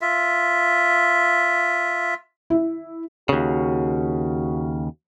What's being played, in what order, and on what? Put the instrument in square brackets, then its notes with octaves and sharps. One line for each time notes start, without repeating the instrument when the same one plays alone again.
[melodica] F4 E5
[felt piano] E4
[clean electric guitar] D#2 C#3 [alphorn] F#4